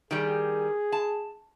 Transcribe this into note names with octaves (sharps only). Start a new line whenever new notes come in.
D#3 G3 G#4
A5